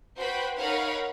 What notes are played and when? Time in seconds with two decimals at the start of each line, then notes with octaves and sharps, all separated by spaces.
0.19 F#4 B4 C5 G5 B5
0.58 D#4 A#4 C#5 F5 F#5 B5